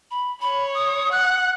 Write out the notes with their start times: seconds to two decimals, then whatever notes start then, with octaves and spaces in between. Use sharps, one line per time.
0.11 B5
0.41 C#5 B5
0.75 D#6
1.12 F#5 F#6